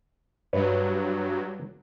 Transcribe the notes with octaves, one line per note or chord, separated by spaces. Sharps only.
G2 F#3 B4 C#5